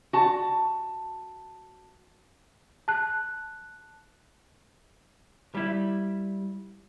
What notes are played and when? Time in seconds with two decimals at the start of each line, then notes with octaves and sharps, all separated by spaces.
0.13 F#4 A5
2.88 A5 F#6
5.55 G3 E4